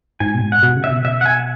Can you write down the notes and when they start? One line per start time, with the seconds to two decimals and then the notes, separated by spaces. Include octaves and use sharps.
0.20 G#2 G#5
0.35 B2
0.42 G#2
0.52 F#5
0.63 B2
0.76 C#3
0.84 E5
0.91 B2
1.05 E5
1.21 F#5
1.26 G#5